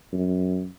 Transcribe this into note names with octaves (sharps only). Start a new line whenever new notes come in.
F#2